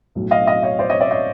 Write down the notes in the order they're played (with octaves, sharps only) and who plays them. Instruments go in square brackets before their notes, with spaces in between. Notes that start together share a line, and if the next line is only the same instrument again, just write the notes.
[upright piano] B1 A2 F#3
D#5 F5
D#5 F5
C#5 D#5
C5 D5
C#5 D#5
D5 E5
C#5 D#5